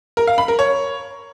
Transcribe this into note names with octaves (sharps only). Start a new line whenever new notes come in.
A#4
F5
B5
A#4
C#5